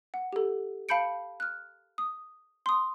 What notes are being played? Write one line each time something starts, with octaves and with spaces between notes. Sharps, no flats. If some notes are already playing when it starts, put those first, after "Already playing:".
F#5
G4 A4
F5 A5 B5 G6 C#7 D7
F6 F#6
D#6
C6 D#6